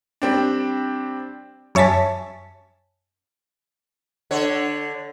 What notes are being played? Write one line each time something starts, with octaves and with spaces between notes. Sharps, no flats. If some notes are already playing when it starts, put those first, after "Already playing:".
G3 C4 D4
F#2 C#5 E5 G#5 A5 B6
D3 C#5